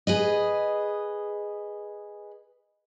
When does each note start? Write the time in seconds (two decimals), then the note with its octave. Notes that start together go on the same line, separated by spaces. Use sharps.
0.07 G#4 B4 D#5